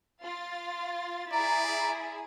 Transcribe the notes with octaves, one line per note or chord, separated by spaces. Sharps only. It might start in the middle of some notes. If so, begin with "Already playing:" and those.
F4 A6
E4 G#4 D5 A#5